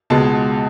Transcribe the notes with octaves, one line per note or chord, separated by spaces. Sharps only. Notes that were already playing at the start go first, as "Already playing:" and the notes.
C#2 B2 G#3 B3 A5